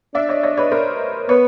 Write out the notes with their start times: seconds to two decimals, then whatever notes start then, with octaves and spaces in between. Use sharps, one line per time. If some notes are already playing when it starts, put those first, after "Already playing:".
0.15 D4 D5 E5
0.29 C#5 D#5
0.43 C#5 D#5
0.57 B4 C#5
0.72 A#4 C5
1.29 B3 B4 C#5